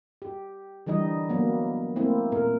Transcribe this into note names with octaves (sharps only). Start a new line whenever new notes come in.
G4
D3 E3 G3 D#4 D#5
F#3 A#3 B3
A3 A#3 C4 E4
A#2 A#4